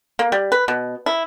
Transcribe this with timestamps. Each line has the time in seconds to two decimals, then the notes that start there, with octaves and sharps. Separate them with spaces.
0.19 A#3
0.32 G3
0.52 B4
0.68 B2
1.06 E4